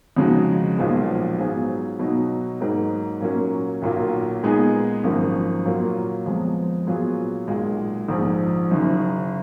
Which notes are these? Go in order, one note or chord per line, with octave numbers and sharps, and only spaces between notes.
F2 C#3 G#3 D#4 F#4
B1 A#2 F3 G#3 B3
G#2 F#3 B3 F4 G#4
B2 F#3 B3 D#4
G#2 F#3 A#3 D#4 F#4
A#2 F#3 A#3 C#4
B1 A#2 F#3 A#3 F4
A#2 G#3 B3 D#4 G#4
G#1 F#2 F3 A#3
A#2 F#3 A#3 F4
F2 F3 G#3 B3
A#2 F#3 B3 F4 G#4
B1 A#2 G#3
A#1 G#2 F3
F#1 F#2 D#3